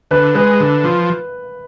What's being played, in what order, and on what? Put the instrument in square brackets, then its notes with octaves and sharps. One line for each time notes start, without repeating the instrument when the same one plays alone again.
[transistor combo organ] D3 [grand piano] B4
[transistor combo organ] G#3 [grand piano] B4
[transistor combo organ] D3
F3